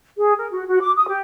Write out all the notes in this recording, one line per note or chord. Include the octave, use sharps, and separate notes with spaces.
G#4
A#4
F#4
F#4
D6
D#6
G4